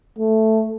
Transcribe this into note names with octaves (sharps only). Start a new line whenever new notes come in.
A3